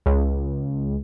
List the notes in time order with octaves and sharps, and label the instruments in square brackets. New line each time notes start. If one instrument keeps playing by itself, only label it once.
[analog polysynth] C#2